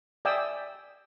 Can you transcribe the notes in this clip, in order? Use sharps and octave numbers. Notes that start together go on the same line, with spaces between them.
D5 E5 G5 G#5 D#6 E6